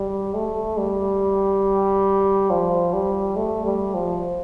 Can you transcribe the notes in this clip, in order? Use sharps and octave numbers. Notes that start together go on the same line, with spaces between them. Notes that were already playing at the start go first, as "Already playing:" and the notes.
Already playing: G3
A3
G3
F3
G3
A3
G3
F3